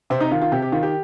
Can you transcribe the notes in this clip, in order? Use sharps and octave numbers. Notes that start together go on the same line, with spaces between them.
C3 C4
D#4
D#3 F4
F4
C3 G4
G4
D#3 F4
G4